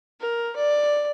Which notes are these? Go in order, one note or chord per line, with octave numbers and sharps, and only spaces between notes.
A#4
D5